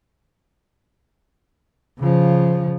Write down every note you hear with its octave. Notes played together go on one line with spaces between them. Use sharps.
C#3 F3